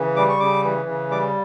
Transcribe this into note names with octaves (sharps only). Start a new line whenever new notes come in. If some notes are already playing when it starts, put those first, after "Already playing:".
Already playing: C#3 E3
G3 D6
C#6
C#3 D6
E3
C#3
G3 D6